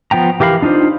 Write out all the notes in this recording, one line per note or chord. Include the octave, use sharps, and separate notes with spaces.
F3 B3 G5 A#5
E3 G4 A#4 F5 B5
D4 D#4 F4 C5